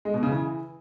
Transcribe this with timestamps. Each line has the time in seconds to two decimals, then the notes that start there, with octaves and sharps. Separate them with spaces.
0.05 G#3
0.14 B2
0.23 C#3
0.31 E3